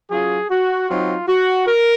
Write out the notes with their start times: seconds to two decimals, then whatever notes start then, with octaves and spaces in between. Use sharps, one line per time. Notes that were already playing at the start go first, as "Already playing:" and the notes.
0.10 F#3 C#4 F4 G#4
0.50 F#4
0.88 F#3 C4 D#4 F4
1.28 F#4
1.66 A#4